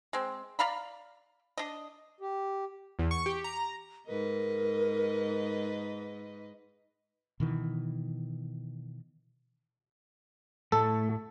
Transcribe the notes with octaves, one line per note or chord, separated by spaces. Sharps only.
G#3 C4
D5 F5 A#5 B5
D4 D#5
G4
E2
C#6
G4
A#5
G#2 A#4 B4 D#5
B2 D#3 E3
A2 A3 A4